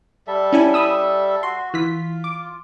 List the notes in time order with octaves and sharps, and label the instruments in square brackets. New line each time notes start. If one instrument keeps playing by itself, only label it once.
[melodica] G3 A4 E5
[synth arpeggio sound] C#4 E4 G#5
B5 D#6 E6
[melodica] F#4 [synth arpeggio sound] C6
[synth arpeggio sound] E3 B6 [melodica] F4
[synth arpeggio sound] D6